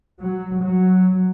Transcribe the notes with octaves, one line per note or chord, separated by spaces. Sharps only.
F#3
F#3